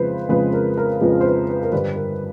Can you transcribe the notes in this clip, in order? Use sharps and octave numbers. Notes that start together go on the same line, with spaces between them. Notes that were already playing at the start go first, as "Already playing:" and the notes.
Already playing: F2 C#3 F3 G#3 B4 C5
F2 C#3 F3 G#3 B4
A#4
A#4
F2 C#3 F3 G#3 B4
C5
B4
B4
A#4
G2 D3 G3 B4
A#4